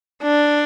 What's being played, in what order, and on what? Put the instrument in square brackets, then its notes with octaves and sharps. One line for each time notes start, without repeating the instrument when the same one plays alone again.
[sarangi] D4